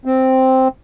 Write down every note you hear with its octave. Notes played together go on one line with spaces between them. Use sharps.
C4